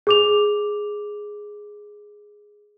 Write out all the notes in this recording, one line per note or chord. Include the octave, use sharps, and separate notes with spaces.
G#4 D6 F7